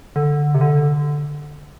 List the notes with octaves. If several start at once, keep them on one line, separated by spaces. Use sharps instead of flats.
D3
C3
D3